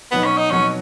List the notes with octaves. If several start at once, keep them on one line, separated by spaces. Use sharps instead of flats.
B2 F#3 B3 D#4
C#4
D#4
B2 F#3 C#4 D#4